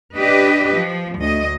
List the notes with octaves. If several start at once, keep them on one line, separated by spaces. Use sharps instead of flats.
D4 G4 B4 D#5
F3
D2 D#5